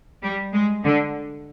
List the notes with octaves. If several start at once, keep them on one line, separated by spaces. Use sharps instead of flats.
G3
G#3
D3